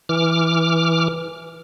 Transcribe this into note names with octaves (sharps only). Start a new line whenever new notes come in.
E3 D6 F6